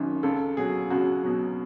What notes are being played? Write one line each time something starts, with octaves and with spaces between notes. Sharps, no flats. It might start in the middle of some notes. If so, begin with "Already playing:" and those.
Already playing: F#1 F#2 D#3
C#2 A4
B2 F#3 G#4
C#2 F#4
B2 F#3